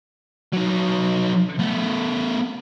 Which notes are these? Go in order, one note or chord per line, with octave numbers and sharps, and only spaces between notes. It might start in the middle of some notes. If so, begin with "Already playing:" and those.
F#3 D#4
A3 B3